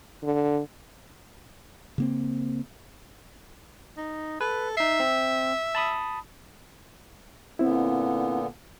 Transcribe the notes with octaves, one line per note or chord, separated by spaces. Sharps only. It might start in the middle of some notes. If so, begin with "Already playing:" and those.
D3
C#3 A#3 C4
D#4
A4 B4
D#4 E5 C7
C4
A5 B5 D#6
A#2 D3 B3 C4 E4